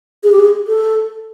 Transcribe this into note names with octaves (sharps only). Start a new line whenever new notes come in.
G#4
G4
G#4
A4